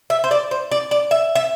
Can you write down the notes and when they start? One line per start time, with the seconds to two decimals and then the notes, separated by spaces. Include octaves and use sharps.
0.10 E5
0.24 C5
0.31 D5
0.51 C5
0.71 D5
0.91 D5
1.11 E5
1.35 E5